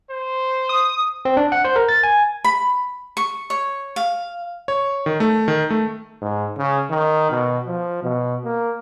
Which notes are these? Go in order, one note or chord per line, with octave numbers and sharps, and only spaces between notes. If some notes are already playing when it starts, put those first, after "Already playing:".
C5
D#6
C4
D4
F#5
C5
A#4
A6
G#5
B5
C#6
C#5
F5
C#5
D#3
A3
D#3
A3
G#2
C#3
D#3
B2
F3
B2
A#3